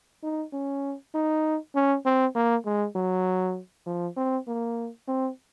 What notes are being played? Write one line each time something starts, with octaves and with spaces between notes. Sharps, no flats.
D#4
C#4
D#4
C#4
C4
A#3
G#3
F#3
F3
C4
A#3
C4